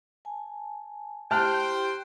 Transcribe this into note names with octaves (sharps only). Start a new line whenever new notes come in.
G#5 A5
E4 G4 C5 G5 A5 F6 F#6